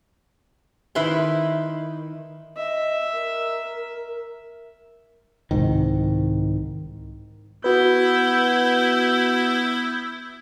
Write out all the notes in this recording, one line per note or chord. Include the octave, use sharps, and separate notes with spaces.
D#3 E4 B4 B5 C6
D#5 E5
A#4
C2 G#2 D#3
B3 E4 F#4 B4 G6